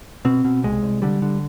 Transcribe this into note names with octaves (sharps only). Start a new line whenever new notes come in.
B2 C4
B2
C2 G#3
C2
D3 G3
D3